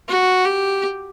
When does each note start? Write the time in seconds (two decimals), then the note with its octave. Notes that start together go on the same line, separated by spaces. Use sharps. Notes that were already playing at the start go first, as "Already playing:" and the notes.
0.08 F#4
0.45 G4